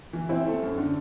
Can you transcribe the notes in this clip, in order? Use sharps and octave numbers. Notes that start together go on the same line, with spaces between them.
E3
C4 E4
A3
F#2
D3